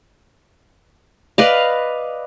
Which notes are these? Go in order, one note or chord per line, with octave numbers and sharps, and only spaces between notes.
B4 D5 D#5 F5